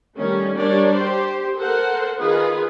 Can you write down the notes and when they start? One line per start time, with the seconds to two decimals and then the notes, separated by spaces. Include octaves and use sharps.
0.17 D#3 G3 A3 C#4
0.56 G3 D4 A#4 C#5 D5
0.94 G4 C5
1.57 A4 A#4 C5 F#5
2.19 D#3 F4 G#4 B4